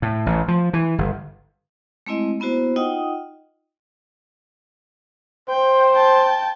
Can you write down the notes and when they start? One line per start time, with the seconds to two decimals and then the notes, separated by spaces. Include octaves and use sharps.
0.02 A2
0.26 A1
0.48 F3
0.73 E3
0.98 G1
2.07 G#3 A3 C4 E4 D#5
2.40 A#3 B3 E4 F#4 C5
2.76 D#4 F4 D#5 F#5 G5 D#6
5.49 C5 G5
5.92 G5 A5